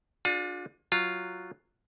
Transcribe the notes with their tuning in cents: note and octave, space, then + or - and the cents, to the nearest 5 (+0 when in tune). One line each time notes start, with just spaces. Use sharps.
D4 +0 F4 +40 G#4 +0
F#3 +0 F4 +0